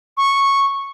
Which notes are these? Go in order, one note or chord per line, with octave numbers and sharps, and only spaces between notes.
C#6